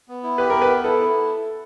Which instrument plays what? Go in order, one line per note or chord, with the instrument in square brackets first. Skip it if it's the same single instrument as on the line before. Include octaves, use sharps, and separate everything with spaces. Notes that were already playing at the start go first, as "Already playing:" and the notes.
[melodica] B3
E4
[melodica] G4 [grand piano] B4
[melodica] B3 [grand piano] A#4
[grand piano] B4
[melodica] B3
[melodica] E4 [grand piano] A4
[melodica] E4